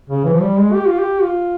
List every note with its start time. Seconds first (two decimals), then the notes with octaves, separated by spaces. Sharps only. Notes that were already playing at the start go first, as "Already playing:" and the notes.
0.10 C#3
0.25 E3
0.34 F3
0.41 G3
0.58 G#3
0.74 G4
0.87 F4
0.98 G4
1.22 F4